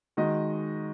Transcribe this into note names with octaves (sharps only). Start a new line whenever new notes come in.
D#3 G#3 F#4 D#5